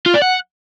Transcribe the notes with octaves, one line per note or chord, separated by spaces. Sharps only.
F4
D5
F#5